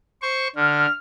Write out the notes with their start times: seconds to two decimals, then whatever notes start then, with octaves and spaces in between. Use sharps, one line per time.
0.22 C5 C#6
0.55 D3 F6